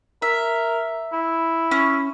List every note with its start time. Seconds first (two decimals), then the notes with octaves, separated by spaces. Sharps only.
0.22 A#4 E5
1.13 E4
1.71 C#4